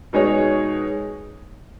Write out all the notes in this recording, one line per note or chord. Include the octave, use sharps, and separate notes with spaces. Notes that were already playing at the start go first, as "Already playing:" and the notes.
B2 G#3 D#4 G#4 C#5